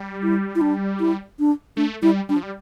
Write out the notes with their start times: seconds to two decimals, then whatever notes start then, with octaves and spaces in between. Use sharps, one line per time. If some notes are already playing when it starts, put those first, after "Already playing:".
Already playing: G3
0.23 E4
0.55 E4
0.61 D4
1.00 E4
1.39 D4
1.77 A3 D4
2.02 G3 E4
2.29 G3 D4
2.36 F3
2.43 G3